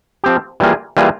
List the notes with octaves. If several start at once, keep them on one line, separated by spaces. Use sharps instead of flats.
F3 C4 G4
E3 G3 A#3 F4 G#4
E3 G3 A#3 F4 G#4